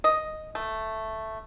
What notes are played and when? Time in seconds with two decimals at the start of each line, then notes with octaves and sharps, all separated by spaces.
0.04 D#5
0.55 A3